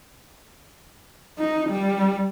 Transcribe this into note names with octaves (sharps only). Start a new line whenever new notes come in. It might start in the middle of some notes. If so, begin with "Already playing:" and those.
D#4
G3